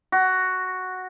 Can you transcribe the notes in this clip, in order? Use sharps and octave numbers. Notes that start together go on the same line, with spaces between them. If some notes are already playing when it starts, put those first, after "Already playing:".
F#4